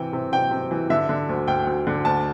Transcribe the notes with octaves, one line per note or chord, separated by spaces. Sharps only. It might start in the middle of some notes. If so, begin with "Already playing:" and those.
Already playing: C3 E3 G5
C3
C3 G5
C3
E3
D3 E5
D3
D2
D2 G5
D2
D3
D2 A5